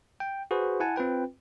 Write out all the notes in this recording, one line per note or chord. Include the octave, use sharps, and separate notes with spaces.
G5
F#4 G#4 B4 C5
E4 F#5 G#5 A5
C4 F4 B4 G5